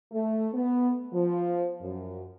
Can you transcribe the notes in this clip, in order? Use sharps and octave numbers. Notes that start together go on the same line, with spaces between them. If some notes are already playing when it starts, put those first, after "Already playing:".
A3
B3
F3
F#2